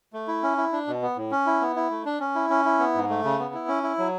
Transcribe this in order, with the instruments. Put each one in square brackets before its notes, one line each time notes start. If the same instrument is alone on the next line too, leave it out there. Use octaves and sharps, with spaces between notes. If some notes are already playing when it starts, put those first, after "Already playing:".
[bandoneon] A3
E4
C#4
E4
D4
B2
B3
A2
C#4
E4
B3
E4
A3
D4
C#4
E4
C#4
E4
B3
G#2
A3
C#3
B3
E4
C#4
E4
F#3